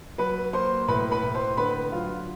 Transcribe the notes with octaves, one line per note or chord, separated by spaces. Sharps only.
F#3 B4 B5
A#3 C5 C6
A2 B4 B5
B4 B5
A2
C5 C6
D3 B4 B5
F#3 F4 F5